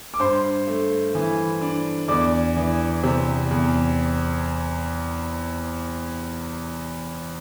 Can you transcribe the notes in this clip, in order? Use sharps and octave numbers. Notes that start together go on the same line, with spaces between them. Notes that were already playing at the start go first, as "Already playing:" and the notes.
D6
G2 C5 C6
A3
E3
D4
E2 D5 D6
E3
C3
E2